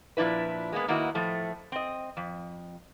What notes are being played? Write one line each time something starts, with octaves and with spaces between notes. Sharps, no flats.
A#2 F3 D4 E4 B4
G#3 A#3 B3
D#3 A#3 B3 E4 F#4 D#5
A2 F3 A3
C4 D#5
F2